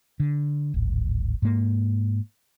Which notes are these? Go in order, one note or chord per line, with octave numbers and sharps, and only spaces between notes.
D3
D1 G#1
G#2 A#3